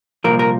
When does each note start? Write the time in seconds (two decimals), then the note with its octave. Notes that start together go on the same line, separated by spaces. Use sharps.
0.24 C2 A#2 F3 A#4
0.39 A#4